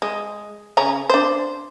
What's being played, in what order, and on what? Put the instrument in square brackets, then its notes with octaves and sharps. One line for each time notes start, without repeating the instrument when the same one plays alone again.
[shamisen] G#3
C#3 C#4 A#5
D4 C5